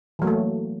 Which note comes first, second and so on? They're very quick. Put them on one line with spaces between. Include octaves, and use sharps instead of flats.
E3 F#3 A#3 A3